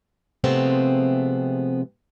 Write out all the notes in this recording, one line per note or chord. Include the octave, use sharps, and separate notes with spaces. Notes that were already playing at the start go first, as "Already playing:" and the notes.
C3 F3 G#3 A3 B3 C4